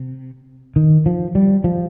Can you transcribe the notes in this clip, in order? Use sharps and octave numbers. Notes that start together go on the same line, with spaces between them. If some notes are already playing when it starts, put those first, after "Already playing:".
Already playing: C3
D#3
F3
G3
F3